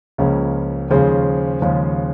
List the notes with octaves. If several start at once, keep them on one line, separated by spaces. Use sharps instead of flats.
C#2 C#3 F3 A#3 C#4
D#2 C#3 F3 G#3 C#4 C5
D#2 C#3 F3 G#3 C#4